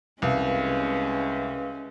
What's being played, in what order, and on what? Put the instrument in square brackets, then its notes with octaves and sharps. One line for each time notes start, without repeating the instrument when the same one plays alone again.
[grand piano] C2 [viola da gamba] G#3 C#4 [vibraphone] B4 F5